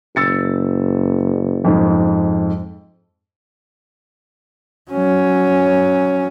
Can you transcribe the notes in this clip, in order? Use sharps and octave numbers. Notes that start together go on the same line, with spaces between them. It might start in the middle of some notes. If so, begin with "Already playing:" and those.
F#1 E6 A6 C#7
F2 G#2
F#3 C#4